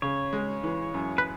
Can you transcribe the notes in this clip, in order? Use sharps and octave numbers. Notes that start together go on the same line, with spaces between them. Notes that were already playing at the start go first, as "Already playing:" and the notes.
C#3 C#5
G#3
E3
F#2
B4